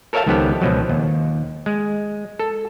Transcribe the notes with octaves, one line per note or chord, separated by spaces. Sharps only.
A4 A#4 C#5 E5 F5 A5
C#2 D#3 F3 B3 G4 A4
C#2 B2 F3 F#3
D#2
G#3
A4